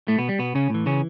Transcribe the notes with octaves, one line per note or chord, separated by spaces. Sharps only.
A2 A3
B2 B3
G3
B2 B3
C#3 C#4
A2 E3
C#3 C#4